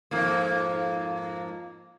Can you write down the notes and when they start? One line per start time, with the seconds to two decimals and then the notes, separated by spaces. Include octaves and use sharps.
0.11 F2 G#2 A#3